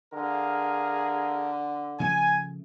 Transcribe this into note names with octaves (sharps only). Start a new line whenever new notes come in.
D3 G#4 A#4 F5
C#3 F3 A3 G#5